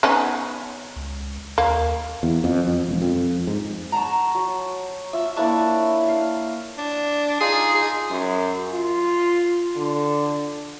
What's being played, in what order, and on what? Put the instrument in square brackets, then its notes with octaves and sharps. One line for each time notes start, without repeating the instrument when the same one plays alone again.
[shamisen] B3 C#4 D#4
[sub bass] C#2
[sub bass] D#2 [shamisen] A#3
[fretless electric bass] E2
F2
F2
E1
F2
G#2
[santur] F#5 A5 C#6 [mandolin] A#5
[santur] F#3
[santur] F4 [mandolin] E5
[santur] A#3 E4 C#5 [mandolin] D4 A5 C#6
[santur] F5
[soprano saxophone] D4
[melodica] D#4 F4 [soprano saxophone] G#4
[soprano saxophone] G#4
[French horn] F#2
F4
D3